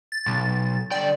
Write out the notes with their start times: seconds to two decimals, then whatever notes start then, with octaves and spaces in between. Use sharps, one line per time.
0.12 A6
0.27 B1
0.91 D3 D5 G5